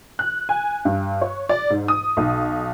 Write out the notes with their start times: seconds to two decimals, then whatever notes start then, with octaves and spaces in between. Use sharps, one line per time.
0.19 F#6
0.49 G#5
0.85 G2
1.21 C#5
1.49 D5
1.70 G#2
1.88 D#6
2.17 B1